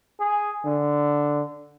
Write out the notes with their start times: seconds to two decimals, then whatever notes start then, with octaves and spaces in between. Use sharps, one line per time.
0.20 G#4
0.65 D3